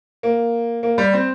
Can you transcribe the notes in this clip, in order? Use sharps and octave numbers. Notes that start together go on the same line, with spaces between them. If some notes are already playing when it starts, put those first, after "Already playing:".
A#3
A#3
G3
C4